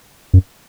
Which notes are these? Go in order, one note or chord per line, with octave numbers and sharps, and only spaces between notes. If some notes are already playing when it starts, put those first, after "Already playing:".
F#2